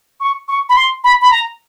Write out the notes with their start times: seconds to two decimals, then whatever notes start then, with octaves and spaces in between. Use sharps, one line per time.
0.21 C#6
0.48 C#6
0.69 B5
0.76 C6
1.04 B5
1.22 B5
1.31 A#5